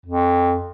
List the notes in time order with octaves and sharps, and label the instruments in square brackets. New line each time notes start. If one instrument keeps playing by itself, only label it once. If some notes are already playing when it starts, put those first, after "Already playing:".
[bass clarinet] F2